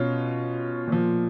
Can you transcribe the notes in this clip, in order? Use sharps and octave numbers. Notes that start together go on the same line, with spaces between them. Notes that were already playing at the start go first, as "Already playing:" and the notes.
Already playing: B2 C#4 F4
A#2 F3